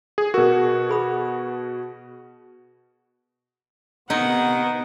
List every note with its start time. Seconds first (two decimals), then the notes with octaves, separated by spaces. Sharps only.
0.18 G#4
0.34 B2 F#4 G#4 A#4
0.89 G#4 B5 D#6
4.10 C3 D#3 B3 D#4 F#5